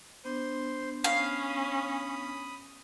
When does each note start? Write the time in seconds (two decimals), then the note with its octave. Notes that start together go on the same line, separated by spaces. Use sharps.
0.25 B3 D4 C5 C6
1.04 C#4 F5 B5 D#6